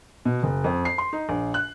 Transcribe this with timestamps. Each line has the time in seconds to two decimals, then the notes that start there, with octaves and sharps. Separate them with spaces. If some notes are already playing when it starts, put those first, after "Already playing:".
0.25 B2
0.43 F#1
0.64 F2
0.85 C7
0.98 C6
1.13 D#4
1.29 A#1
1.54 F#6